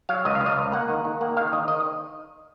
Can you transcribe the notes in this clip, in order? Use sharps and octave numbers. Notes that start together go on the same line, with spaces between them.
F#3 F5
C#2 D#5
F5
C#2
D#5
C#2
A#3 F#5
D#3
D#3
A#3 F#5
D#3 F5
D#3 D#5
D#3 D#5